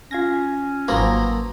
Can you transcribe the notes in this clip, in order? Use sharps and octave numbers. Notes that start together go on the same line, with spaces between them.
C#4 F4 G#6 A#6
G#1 F3 F#3 A#3 B4